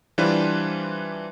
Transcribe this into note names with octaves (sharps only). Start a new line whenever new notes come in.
E3 G3 D4 F4 B4 C5